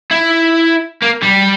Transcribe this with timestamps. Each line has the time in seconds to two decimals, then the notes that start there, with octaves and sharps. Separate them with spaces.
0.11 E4
1.03 A#3
1.23 G3